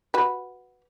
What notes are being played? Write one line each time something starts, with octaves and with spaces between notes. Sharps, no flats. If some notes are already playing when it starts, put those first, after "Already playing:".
F#4 B4